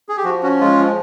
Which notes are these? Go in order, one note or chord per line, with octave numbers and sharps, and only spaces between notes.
G#4
G4
F3 F#4
C#4 F#4
G#3 F4
F3